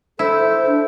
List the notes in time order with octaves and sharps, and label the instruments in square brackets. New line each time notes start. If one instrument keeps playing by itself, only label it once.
[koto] E4 [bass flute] A4 [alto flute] C5
[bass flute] D4